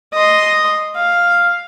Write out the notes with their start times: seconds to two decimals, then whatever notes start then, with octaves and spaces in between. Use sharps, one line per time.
0.13 D#5 C6
0.96 F5